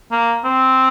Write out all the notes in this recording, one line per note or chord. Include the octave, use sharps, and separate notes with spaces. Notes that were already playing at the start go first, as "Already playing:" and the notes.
A#3
C4